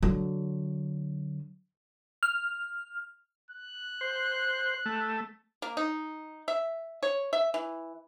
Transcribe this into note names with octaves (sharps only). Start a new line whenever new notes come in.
D3 F#3
F6
F#6
C5
A3
A#3
D#4
E5
C#5
E5
E3